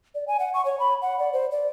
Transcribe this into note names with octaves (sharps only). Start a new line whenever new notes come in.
D5
G#5
F#5
C#6
C#5
B5
F#5
D5
C5
D5